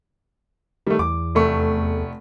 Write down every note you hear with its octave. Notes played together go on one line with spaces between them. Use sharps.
D#3 G3 A3
E2 D6
F1 A3 C#6